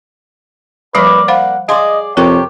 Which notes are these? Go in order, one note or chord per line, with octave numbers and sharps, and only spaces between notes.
F3 G3 A#3 B4 D5
C5 F5 F#5 B5
G#4 D5 D#5 F5 C6
F2 C3 G4 A#4 C#5 G5